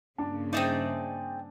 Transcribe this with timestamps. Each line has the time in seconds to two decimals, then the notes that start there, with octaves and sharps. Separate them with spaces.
0.18 G2 C#3 A#3 D4 A5
0.53 C4 D#4 G#4 D5 E5